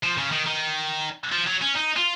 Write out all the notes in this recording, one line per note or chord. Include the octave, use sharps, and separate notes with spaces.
F3
C#3
D#3
D#3
F3
F#3
C#4
D#4
F4